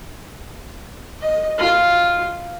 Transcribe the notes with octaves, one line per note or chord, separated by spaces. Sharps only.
D#5
F4